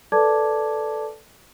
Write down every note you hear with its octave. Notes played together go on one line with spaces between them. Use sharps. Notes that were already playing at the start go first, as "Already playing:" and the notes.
A4 B4 D5 A5 D6 G#6